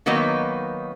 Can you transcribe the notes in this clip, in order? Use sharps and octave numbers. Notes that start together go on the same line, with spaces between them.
D#3 F#3 A#3 B3 D#4